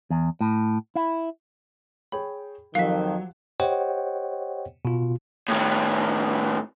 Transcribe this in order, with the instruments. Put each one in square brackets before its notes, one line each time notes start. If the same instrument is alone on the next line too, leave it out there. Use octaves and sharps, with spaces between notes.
[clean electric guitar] E2
A2
E4
[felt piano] G#4 C#5 G5 [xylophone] B5
[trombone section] F2 D#3 [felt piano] F3 G4 F#5 [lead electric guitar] F#3 [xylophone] F5 B6
[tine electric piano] G4 C5 C#5 D#5 F#5 G5
B2 F4
[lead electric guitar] A2 D#3